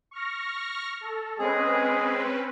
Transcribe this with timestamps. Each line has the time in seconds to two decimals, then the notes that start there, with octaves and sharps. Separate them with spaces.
0.11 C#6 F6 A#6
1.01 A4
1.39 G#3 C4 C#4 G#4 B4